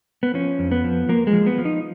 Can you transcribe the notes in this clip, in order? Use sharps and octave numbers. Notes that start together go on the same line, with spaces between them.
B3
F3 C#4
F2
B3
F3
F3 A#3
G#3
F3
B3
F3
D#4